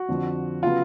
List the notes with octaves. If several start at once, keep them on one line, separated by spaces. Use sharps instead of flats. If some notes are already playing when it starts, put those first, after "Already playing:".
Already playing: F#4
F2 D3 F3
C#3 F#3 B3 F4